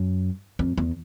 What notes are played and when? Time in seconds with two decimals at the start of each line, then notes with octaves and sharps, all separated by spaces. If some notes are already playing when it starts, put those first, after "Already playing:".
Already playing: F#2
0.59 F2
0.78 E2